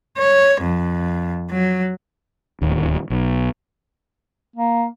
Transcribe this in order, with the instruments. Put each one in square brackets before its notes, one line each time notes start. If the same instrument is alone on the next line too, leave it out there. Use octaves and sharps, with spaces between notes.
[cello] C#5
F2
F#3
[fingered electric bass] D1 D#2
B1
[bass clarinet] A#3